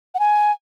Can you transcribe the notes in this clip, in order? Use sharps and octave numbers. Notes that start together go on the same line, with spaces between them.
F#5
G#5